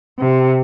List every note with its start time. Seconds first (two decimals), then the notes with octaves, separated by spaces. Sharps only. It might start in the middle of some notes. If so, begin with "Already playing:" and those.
0.19 C3